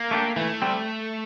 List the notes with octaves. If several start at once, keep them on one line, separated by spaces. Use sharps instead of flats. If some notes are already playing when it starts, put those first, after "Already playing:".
Already playing: A#3
A3 D4 G4
E3 A3
G3 C4